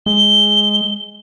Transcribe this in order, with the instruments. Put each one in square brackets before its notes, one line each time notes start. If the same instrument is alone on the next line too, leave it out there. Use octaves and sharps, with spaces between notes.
[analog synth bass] G#3 [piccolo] G7